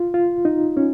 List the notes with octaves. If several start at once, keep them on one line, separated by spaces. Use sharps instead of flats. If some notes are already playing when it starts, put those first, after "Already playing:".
Already playing: F4
F4
D#4
C#4